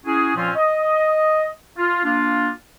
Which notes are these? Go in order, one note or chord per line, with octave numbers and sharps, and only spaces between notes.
C#4 E4 F#4 G#4
A#2 F3 C4 C#4 F4
D#5
F4
A#3 D4 F4